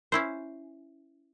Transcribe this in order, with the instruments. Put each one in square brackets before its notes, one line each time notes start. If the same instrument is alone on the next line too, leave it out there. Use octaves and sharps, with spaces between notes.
[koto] C#4 E4 C5